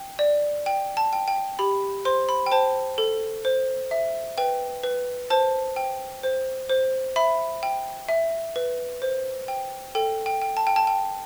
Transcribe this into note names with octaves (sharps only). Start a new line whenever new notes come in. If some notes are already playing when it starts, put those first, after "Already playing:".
Already playing: G5
D5
G5
A5
G5
G5
G4 B5
C5 C6
B5
G5
C5 A5
A4
C5
E5
B4 G5
B4
C5 A5
G5
C5
C5
E5 B5
G5
E5
B4
C5
G5
A4 G5
G5
G5
A5
G5
A5
G5